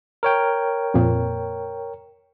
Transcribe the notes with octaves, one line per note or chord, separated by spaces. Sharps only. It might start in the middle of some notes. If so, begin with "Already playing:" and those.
A#4 C#5 G5
F2 A#2